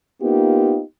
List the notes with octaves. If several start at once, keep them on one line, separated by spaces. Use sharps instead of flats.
A#3 B3 D#4 F4 G4